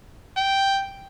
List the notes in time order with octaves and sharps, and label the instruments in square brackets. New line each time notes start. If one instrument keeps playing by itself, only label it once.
[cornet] G5